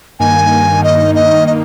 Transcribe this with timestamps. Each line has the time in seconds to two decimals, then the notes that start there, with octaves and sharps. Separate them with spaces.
0.19 G2 D#3 A#3 D#4 G#5
0.83 D#5
1.15 D#5
1.46 D#5